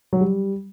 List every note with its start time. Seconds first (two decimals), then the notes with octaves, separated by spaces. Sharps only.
0.13 F#3
0.21 G3